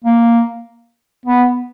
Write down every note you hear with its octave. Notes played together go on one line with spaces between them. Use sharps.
A#3
B3